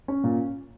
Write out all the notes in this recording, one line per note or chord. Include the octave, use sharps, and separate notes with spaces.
C#4
A#2